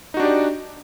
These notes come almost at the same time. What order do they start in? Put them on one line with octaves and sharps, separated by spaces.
D#4 F#4 D4 G4 D5